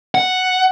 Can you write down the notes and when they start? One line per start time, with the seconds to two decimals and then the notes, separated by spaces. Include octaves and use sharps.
0.15 F#5